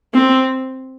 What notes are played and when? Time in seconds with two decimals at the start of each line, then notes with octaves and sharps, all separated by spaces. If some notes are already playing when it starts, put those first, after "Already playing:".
0.14 C4